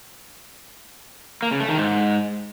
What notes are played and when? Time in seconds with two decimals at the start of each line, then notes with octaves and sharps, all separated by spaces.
1.43 A#3
1.51 C#3
1.60 A3
1.69 D#3
1.77 G#2